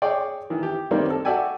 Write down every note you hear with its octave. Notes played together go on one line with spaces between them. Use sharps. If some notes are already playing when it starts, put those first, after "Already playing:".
G#4 C#5 D5 G5
D#3 E3
G4
D#3 G3 A#3 C4 D4 D#4
A4
F#4 A4 D5 E5 G5 G#5